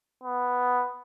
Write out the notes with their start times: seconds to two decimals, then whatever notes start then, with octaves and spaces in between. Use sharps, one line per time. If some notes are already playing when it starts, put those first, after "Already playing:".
0.23 B3